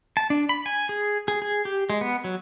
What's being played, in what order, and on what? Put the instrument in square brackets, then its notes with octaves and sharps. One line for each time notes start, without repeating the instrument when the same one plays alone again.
[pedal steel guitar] A5
D4
B5
G#5
G#4
G#4
G#4
G4
G#3
B3
F#3